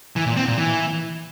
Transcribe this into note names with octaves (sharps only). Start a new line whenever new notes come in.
E3
A#2
C4
A#2
E3